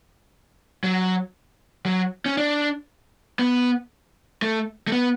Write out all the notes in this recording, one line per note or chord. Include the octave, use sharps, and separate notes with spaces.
F#3
F#3
C#4
D4
B3
A3
A3
B3